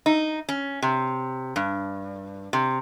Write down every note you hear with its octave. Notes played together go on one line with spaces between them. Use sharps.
D#4
C#4
C3
G2
C3